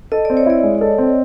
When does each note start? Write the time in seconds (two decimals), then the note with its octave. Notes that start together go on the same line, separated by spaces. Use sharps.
0.12 A4 D#5
0.25 C4 D5
0.37 C#5
0.46 E4 D5
0.63 G#3
0.81 A4
0.98 C4